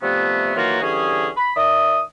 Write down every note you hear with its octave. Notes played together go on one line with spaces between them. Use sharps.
C3 F3 G3 A3 B3
D#3 E3 F#3 A#3 F4 F#4
D3 E3 G3 C#4 G#4
B5
D#3 D5 E5 D#6